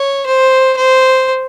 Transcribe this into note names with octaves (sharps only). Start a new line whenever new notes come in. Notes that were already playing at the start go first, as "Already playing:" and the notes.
Already playing: C#5
C5
C5